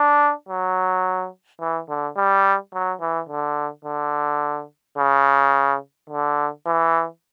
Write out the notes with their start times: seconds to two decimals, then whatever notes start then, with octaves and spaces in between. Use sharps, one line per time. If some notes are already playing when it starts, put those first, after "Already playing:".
Already playing: D4
0.49 F#3
1.61 E3
1.89 D3
2.17 G3
2.74 F#3
3.01 E3
3.29 D3
3.85 D3
4.98 C#3
6.10 D3
6.66 E3